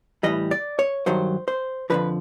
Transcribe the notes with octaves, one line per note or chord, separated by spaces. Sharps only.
A2 E3 G3 D#5
D5
C#5
G2 D#3 F#3 C5
C5
F2 D3 F3 B4